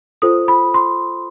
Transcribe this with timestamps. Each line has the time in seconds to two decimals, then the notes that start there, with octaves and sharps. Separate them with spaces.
0.22 F4 A4 C5 D#6
0.48 B5
0.74 C6